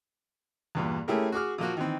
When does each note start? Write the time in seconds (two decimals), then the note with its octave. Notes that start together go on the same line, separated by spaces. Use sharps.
0.75 E2 G2 A#2
1.08 A3 C#4 E4 G4 G#4 A#4
1.32 F#4 G#4 D6 F6
1.58 A#2 F3 A#3 F#4
1.77 D#3 E3 C4